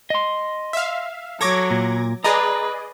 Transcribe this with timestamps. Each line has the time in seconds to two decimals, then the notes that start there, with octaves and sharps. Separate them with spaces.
0.10 D#5 C6
0.73 E5 F5
1.41 F#3 A4 C#5 D6 G#6 A#6
1.71 A#2
2.24 G#4 B4 D5 D#5 A#5